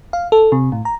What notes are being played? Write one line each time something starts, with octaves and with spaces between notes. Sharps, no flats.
F5
A4
C3
A2
A#5